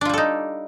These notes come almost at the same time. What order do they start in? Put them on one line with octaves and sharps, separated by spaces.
D4 F4 G3 A4 D#4